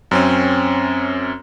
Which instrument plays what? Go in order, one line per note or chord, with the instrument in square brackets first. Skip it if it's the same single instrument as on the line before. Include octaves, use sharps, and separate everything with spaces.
[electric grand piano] F#2 C4 C#4